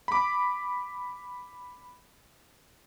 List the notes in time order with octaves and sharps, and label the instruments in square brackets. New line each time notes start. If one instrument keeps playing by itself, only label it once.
[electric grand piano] B5 D6